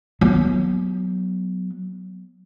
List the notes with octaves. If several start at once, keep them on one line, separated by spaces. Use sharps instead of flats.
F#3 B3